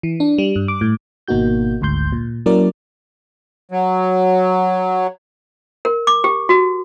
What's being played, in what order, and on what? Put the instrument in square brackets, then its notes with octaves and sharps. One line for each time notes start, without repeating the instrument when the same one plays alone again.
[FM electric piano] E3
D4
G3
G2
D6
A2
G#1 B2 A#3 D#4 F#4 G6
G#1 D2 G#2 C6 G6
A#2
F#3 A#3 C#4 E4 A#4 D5
[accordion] F#3
[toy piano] A#4
D6
G4
F#4